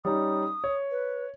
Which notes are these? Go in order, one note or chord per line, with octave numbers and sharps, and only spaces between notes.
G3 C#4 D#4 D#6
C#5
B4